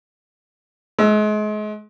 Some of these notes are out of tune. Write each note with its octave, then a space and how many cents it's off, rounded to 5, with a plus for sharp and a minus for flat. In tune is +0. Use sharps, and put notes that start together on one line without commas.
G#3 +35 E6 +0